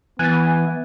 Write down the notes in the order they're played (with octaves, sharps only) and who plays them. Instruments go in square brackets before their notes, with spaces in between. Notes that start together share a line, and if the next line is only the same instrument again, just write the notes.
[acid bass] E3 [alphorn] B3 [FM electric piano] G#5 [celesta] F#6 A6